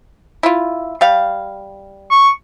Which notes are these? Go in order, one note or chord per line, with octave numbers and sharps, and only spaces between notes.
E4 F4
G3 F5
C#6